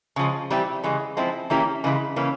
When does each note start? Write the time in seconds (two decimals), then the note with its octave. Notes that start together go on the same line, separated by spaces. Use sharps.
0.16 C#3 F3 G#3
0.50 E3 G3 C4 E4 G4
0.83 C#3 E3 G#3
1.17 F3 G#3 C4 E4
1.50 E3 A#3 C#4 E4 G4
1.84 C#3 E3 G#3 E4
2.16 C#3 E3 A#3 C#4